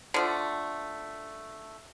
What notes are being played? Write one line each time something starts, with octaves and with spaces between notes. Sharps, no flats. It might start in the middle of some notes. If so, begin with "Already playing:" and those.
D3 F3 A3